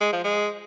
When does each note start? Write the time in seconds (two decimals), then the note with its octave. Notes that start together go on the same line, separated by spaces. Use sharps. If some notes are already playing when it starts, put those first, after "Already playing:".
0.01 G#3
0.13 F3
0.24 G#3